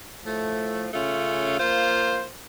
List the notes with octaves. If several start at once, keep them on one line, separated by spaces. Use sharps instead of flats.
A2 F3 A3
C#3 A3 C#4 F4
A#3 F4 C5